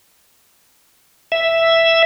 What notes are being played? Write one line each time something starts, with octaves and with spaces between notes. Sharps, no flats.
E5